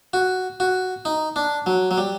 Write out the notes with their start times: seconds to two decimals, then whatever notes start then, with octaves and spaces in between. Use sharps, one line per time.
0.13 F#4
0.60 F#4
1.05 D#4
1.36 D4
1.66 F#3
1.91 F#3
1.98 G3